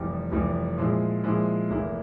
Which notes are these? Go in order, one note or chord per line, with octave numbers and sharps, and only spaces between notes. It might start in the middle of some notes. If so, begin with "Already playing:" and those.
Already playing: F1 F2 E3 G3
F1 F2 E3 G3
A#2 F3 G#3 E4
A#2 F3 G#3 E4
F1 E2 E3 A#3 E4